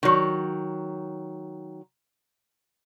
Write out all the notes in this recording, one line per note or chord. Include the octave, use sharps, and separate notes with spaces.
D#3 F#3